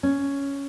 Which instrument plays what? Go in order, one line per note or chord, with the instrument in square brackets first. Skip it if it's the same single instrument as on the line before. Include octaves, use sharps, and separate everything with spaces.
[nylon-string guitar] C#4